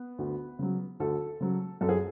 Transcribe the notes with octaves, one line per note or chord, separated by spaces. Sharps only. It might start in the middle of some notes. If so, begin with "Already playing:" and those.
Already playing: B3
D2
C#3 F#3
D2 A4
C#3 F#3
F#2 A4
G#4